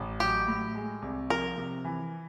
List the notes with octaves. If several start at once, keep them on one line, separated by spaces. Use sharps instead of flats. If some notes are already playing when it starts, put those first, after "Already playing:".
Already playing: A1
F#3 G4
A2
G#3
C2
F3 A#4
C3
E3